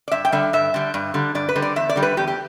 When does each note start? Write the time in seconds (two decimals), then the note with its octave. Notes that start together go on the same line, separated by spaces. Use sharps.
0.08 D5
0.11 G2 E5
0.25 G5
0.32 D3 G3 E5
0.53 G2 E5
0.74 D3 G3
0.94 G2
1.14 D3 G3
1.35 G2 D5
1.49 B4
1.56 D3 G3
1.62 D5
1.76 E2 E5
1.89 D5
1.96 D3 G3
2.02 B4
2.17 E2 G4
2.27 G4